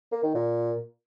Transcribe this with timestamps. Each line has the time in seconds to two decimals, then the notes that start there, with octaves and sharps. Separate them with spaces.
0.12 A#3
0.23 D#3
0.35 A#2